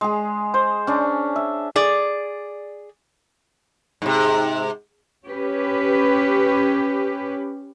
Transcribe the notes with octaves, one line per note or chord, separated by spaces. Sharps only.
G#3 G#4
C5
C#4 D4
E5
G#4 D5
G#2 C3
C#4 G4 B4